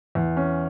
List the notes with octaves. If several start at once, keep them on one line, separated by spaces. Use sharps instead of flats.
E2
C#4